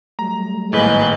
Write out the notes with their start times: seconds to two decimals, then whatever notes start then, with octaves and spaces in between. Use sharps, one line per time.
0.19 F#3 G3 A3 A#5
0.73 G#1 A2 G#3 A#3 B4 G6